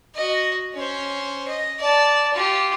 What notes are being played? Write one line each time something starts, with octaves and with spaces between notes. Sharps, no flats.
F#4 D#5
C#4 C5
D#5
D5 A5
F4 G4